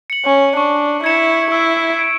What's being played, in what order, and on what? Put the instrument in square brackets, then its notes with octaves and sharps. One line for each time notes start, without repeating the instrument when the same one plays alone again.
[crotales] C#7 F#7
[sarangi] C#4
[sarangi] D4 [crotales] C#6
[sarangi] E4 [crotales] G#6 C#7 E7
[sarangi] E4 [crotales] E6
[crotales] G#6 D7